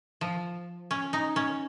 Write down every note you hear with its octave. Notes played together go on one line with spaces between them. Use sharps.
F3
C#4
D#4
C#4